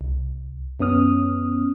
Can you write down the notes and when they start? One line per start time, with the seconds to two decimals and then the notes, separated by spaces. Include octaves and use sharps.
0.01 C2
0.80 F#2 B3 C#4 D#6 F6